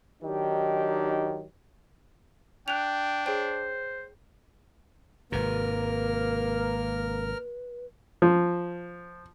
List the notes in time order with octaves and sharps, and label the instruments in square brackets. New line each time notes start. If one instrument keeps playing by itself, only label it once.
[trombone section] D#3 F#3 D4 D#4 G4
[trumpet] D4 [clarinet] G5 [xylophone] F#6 F7
[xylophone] G#4 C#5 G5 [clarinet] C5
[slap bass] G#1 G#2 C3 [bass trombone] A#3 [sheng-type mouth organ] A#4 F6 [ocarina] B4
[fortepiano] F3